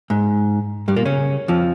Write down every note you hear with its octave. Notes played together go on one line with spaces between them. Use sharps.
G#2
G2 G3
A#2 A#3
C#3 C#4
F2 F3